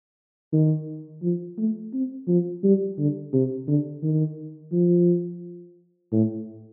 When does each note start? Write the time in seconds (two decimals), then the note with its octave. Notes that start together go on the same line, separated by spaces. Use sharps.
0.53 D#3
1.22 F3
1.58 A3
1.93 C4
2.28 F3
2.63 G3
2.98 D3
3.33 C3
3.68 D3
4.03 D#3
4.72 F3
6.12 A2